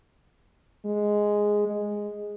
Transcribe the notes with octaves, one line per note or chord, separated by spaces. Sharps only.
G#3
G#3